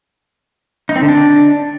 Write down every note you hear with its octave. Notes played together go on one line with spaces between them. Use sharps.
D#4
C4
D3
D4